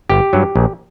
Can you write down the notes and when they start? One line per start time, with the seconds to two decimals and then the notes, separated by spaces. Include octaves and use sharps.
0.10 G1 G4
0.33 G2 F#3
0.56 A#1